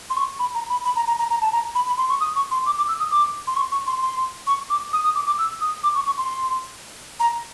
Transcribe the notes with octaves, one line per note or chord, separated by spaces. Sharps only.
C6
C#6
B5
A#5
B5
B5
A#5
A#5
A#5
A#5
A5
A#5
B5
B5
C6
C#6
D#6
C#6
C6
D6
D6
E6
D#6
D6
C6
C#6
C#6
C6
C6
C#6
D6
D#6
D#6
D6
D6
E6
D#6
D6
C#6
C#6
C6
A#5